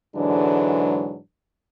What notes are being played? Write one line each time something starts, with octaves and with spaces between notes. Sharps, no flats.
G#2 D3 E3 F#3 G#3 D4